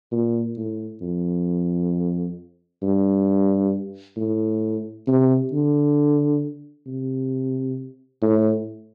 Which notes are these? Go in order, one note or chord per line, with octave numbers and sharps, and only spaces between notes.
A#2
A2
F2
G2
A2
C3
D3
C3
A2